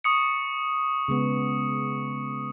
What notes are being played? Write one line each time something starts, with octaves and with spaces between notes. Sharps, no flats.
C#6 D#6 C#7
C#3 G#3 B3